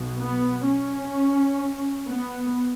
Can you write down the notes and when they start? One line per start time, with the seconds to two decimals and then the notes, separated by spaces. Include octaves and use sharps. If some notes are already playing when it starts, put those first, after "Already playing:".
Already playing: B1 B2
0.19 B3
0.66 C#4
2.09 B3